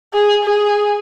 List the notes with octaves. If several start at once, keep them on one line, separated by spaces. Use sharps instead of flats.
G#4
G#4